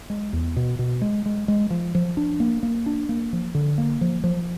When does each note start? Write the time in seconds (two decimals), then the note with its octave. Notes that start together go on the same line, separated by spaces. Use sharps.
0.10 G#3
0.33 E2
0.56 B2
0.79 B2
1.02 G#3
1.26 G#3
1.48 G#3
1.70 F3
1.95 F3
2.17 D4
2.40 A#3
2.63 A#3
2.86 D4
3.09 A#3
3.33 F3
3.55 D3
3.78 A#3
4.01 F3
4.24 F3